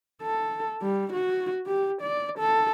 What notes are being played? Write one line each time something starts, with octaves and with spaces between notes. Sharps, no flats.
A4
G3
F#4
G4
D5
A4